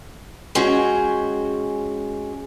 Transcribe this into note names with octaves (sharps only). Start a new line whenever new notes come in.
G#3 C#4 F#4 G#4 G5